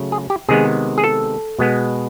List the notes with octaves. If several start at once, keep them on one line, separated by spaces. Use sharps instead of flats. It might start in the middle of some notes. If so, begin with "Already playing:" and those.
Already playing: C#3 F#3 A3
G#4
G4
C3 D#3 G#3 B3 G#4
G#4
A4
B2 G#3 B3